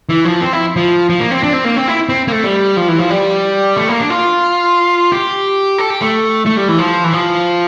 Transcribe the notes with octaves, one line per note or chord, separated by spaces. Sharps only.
E3
F3
C4
E4
F3
F3
A#3
C4
D4
C4
A#3
C4
E4
C4
A#3
A3
G3
F3
E3
F3
G3
A3
A#3
D4
F4
G4
A4
G4
A3
A3
G3
E3
F3
E3
F3